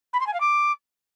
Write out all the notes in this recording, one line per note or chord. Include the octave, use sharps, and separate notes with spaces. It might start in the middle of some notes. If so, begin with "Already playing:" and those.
B5
C6
G#5
F5
D6